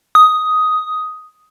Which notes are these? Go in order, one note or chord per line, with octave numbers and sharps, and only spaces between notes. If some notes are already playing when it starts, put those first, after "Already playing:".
D#6